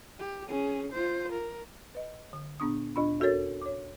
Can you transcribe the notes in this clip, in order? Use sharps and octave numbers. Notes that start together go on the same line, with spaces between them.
G4
C#4 G#4
F4 C5
A#4
B4 D#5
D3
A#2 B3 D4 D#6
D2 A#2 D4 F4 B5
D#2 F#4 A4 A#4 C#5 A6
C#5 D6